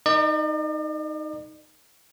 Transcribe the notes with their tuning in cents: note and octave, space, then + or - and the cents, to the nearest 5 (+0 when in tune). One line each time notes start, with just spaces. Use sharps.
D#4 +0 A#4 +0 D5 +45